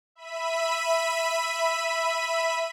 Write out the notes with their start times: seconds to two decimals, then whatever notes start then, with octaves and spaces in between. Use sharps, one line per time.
0.15 E5 B5 B6 D#7